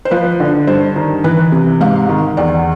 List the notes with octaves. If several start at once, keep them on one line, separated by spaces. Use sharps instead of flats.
C5
F3 B4
D3
G2 C5
D#3
E3 B4
C3
G#2 F5
D#3
E2 D5